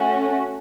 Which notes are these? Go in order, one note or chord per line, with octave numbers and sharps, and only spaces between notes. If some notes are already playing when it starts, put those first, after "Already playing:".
Already playing: A3 C#4 F#4